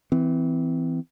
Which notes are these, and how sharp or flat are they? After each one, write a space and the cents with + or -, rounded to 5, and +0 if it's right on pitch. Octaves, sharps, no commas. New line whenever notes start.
E3 +0 C4 -25